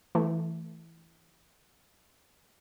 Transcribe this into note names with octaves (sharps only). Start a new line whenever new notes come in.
E3 A3